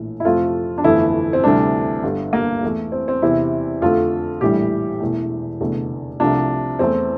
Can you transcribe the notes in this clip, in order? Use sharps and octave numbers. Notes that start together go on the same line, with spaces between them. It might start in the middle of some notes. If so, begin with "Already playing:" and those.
Already playing: A#1 A2 E3
E4
F2 C3 F3 A3 F4
D4
G1 F2 E3 A3 E4
C4
D2 C3 E3 G3 D4
G1 G2 D3
A#3
E2 E3 A3
C4
C4
E2 C3 E3 E4
F2 D3 A3 F4
A#1 A2 E3 G3 G4
E1 E2 E3 A3
F1 E2 D3 A3
C2 C3 F3 A3 D4
E2 E3 A3 C4